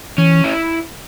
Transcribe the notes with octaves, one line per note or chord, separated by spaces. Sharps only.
E3 C#4
E4